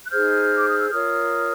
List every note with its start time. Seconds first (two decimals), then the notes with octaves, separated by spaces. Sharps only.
0.05 F#6
0.11 D#4 G#4 C5 F6 G6
0.56 D6
0.68 D#6
0.79 E6
0.90 F4 A#4 C#5 D#6 F6